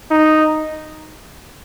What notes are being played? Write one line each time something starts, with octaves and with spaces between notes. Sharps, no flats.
D#4